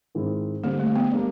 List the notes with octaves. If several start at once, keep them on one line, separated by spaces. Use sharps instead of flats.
G#2 D#3 G#3 C4 E4
D3 G3 A#3 C4
A3
B3
G3 A#3 D4